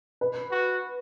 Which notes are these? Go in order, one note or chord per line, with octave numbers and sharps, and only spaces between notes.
B4
F#4